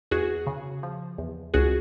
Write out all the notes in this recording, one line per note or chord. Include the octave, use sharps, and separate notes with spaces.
E2 F#4 G#4
C#3
F3
E2
C#2 F#4 G#4